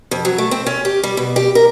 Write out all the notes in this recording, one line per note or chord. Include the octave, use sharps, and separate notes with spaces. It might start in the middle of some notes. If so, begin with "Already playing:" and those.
F2
F#3
A3
C4
C#4
G4
G3
B2
G4
A#4